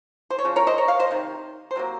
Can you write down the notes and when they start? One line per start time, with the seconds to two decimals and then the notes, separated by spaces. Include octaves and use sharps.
0.30 C5
0.39 C#5
0.45 C#3 F3
0.56 A#4 C#5
0.67 C5 D#5
0.78 A#4 C#5
0.88 C#5 F5
0.99 C5 D#5
1.11 C3 D#3
1.71 C5
1.76 C3 F#3 A#3